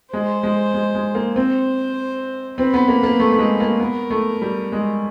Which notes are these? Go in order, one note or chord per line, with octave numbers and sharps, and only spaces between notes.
G#3 C5
G#3
G#3
G#3
A#3
C4 C5
C4 B4
B3
A#3
A#3
A3
A3
G#3
A#3
B3 A#4
A3
G3
G#3